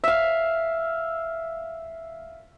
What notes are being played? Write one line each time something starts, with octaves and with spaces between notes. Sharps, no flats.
E5 F5